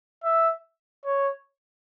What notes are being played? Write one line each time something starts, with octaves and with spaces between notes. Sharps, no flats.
E5
C#5